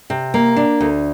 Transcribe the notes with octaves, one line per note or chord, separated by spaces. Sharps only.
C3
A#3
D4
D2